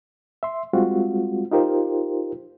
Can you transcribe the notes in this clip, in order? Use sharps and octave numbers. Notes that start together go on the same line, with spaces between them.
E5 C6
G3 G#3 C4 F4 F#4
D#4 F4 G4 A#4 C5